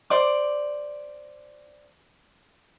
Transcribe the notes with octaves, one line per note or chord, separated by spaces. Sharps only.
C5 D5 D6